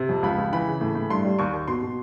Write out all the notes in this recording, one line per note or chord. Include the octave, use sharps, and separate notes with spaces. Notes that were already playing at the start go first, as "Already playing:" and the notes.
Already playing: C3
F2
C#2 B5
C#2
E3 B5
C#3
A2
A2
G2 C6
G3
D#2 C#6
D#2
B2 C6
B2